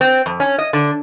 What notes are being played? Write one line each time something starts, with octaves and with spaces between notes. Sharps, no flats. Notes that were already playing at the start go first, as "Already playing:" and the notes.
C4
F2
C#4
D#5
D3